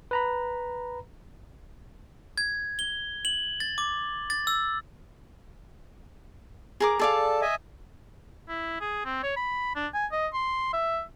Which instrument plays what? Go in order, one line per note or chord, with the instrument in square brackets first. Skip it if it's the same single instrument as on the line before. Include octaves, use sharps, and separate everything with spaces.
[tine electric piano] B4 A#5 B5
[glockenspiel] G#6
G7
F#7
A6
D6
A6
E6
[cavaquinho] G#4 A#4 D6
[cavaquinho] G#4 D5 F5 [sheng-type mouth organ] A4 A5
[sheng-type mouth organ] D#5 E5 G#5
[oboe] E4
G#4
C4
C#5
B5
D4
G#5
D#5
C6
E5